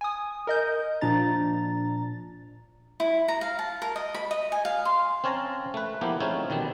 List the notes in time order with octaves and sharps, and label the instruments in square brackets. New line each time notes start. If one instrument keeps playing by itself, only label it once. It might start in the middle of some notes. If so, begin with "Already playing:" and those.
[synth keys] G#5 D#6
A#4 D#5 G6
A#2 F3 D4 A#5 A6
[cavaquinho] E4
A#5
F5
A5
A#4
D#5
B5
D#5
G#5
F5
C6
[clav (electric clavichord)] C4 C#4 C#5 F5 A5 A#5
A3 B4
F3 A#3 B3 E4 G4
A3 C4 C#4 D#4 F4 G#4
B2 D#3 G3 C4